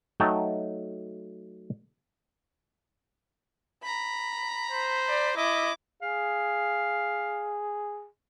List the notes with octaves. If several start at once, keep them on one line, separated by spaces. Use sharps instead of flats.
F#3 A3 D#4 G5 A5
A#5 B5
C5
D5
E4 D#5 D6
G#4 F5